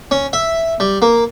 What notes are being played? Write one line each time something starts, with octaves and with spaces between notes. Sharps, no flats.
C#4
E5
G3
A#3